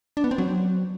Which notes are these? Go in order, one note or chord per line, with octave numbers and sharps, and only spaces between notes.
D4
B3
C4
F#3